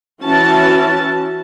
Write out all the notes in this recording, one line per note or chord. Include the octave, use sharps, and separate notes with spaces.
E3 C#4 F#4 A5